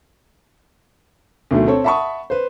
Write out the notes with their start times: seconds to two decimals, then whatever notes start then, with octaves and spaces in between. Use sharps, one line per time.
1.51 D2 B2 D#3 F#3 A3
1.68 C4 A4 C#5
1.84 E5 F#5 A5 B5 C#6 D#6
2.30 B4 C5